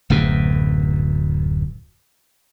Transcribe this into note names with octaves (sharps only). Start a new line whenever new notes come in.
D1 F#2 B2